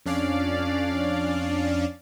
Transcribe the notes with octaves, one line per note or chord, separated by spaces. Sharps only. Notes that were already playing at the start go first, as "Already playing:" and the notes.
F2 C#4 D4 D5 F5